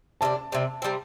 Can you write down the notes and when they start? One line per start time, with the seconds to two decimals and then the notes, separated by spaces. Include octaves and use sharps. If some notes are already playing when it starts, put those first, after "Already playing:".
0.21 C3 G3 D4 A5
0.52 C3 G3 C4
0.82 C3 G3 C4